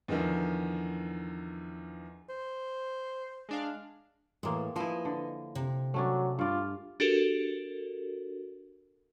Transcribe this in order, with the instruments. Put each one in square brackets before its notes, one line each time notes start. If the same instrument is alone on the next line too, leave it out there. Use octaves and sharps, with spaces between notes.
[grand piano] E2 D3 D#3 F3
[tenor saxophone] C5
[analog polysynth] G#3 D4 F5
[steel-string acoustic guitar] A2 E3 [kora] G#3 A#3
[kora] F3 E4 [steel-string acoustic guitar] B4 D#5 G#5
[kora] D3
[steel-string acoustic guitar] C3
[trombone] F#3 [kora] A3 C#4 D4
[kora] G2 D5 [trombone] F4
[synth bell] D4 F#4 G4 A4 A#4